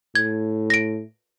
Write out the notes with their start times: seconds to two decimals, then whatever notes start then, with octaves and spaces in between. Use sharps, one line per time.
0.15 A2 G#6
0.70 A#6 D7